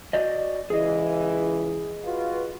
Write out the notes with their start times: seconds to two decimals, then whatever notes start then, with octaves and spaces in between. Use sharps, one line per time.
0.13 F#4 D5 D#5
0.70 C#2 E3 G#4 D#5
2.04 F4 F#4 B4